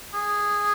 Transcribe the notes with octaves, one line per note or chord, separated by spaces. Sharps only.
G#4